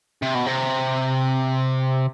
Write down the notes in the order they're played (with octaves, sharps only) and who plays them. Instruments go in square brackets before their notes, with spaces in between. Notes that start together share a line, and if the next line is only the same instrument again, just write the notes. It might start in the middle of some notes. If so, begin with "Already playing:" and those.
[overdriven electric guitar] C3
B2
C3